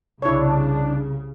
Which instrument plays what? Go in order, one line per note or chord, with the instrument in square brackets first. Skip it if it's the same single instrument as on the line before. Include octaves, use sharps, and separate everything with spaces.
[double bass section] C2 C#3 [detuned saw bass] D4 [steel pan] E4 C#5